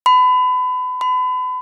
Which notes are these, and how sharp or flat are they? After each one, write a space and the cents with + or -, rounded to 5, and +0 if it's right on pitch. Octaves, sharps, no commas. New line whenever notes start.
B5 +30
B5 +35